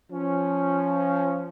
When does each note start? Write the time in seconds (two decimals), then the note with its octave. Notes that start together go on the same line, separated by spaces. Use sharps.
0.11 F3 C#4